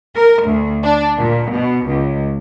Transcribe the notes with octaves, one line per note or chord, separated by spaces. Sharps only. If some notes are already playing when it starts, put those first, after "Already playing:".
A#4
D2
D4
A#2
B2
C#2